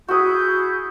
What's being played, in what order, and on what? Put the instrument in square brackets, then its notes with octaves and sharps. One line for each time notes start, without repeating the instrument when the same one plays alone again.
[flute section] E4 G#4 G6 [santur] F#4 D#6